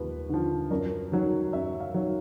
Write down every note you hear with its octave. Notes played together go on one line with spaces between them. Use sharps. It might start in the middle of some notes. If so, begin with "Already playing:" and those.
Already playing: D#2 F3 B4
D3 F3
F#2 A#4
D#3 F#3
F#2 E5
F5
D#3 F#3